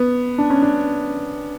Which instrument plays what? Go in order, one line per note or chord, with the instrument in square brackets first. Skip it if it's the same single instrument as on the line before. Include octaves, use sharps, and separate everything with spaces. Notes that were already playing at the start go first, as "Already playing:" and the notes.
Already playing: [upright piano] B3
D4
C#4
D4